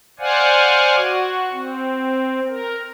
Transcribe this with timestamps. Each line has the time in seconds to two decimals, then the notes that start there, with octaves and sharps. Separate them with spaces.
0.19 C5 D5 F5 F#5 G#5
0.96 F#4
1.53 C4
2.48 A#4